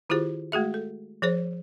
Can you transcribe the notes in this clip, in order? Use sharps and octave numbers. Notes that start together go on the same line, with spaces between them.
D#3 E4 F4 G4 G#4 C5
G#3 A3 F#4 G#4 E5
A4
F3 G#4 C5 C#5